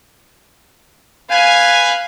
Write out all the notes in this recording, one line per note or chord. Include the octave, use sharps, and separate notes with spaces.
B4 F5 G#5